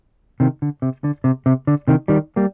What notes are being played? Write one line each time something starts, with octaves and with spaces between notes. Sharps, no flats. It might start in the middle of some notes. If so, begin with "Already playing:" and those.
C3 D#3
D3
C3
D3
C3
C3
D3
C3 D#3
D#3 G3
G3 A#3